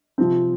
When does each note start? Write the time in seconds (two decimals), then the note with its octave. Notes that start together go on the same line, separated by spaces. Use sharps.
0.18 C3 F3 C4